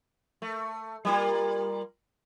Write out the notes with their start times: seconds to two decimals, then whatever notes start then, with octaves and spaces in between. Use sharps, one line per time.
0.42 A3
1.05 G3 A#3 F4